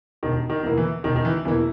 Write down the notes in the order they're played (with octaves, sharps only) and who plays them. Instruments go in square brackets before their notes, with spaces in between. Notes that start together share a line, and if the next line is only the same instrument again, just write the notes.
[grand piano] E1 [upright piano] D#3
[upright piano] D#3
[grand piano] E2 B2 A#3 E4
[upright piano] E3
[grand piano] E1 [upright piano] D#3
[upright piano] D#3
E3
[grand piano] E2 B2 A#3 E4 [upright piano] E3